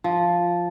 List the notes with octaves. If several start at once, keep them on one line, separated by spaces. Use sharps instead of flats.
F3